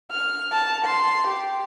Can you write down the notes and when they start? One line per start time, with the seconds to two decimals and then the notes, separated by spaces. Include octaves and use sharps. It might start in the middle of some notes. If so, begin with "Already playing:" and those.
0.11 F6
0.52 A5
0.85 C6
1.27 G4